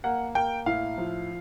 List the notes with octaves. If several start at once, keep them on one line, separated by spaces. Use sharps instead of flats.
A#3 F#5
A#3 G5
A2 F5
F3